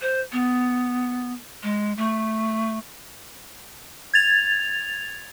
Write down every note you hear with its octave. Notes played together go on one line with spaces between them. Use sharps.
C5
B3
G#3
A3
G#6 A6 F7